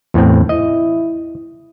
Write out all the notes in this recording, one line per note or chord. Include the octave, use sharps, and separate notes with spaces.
E2 A2 C4
E4 D#5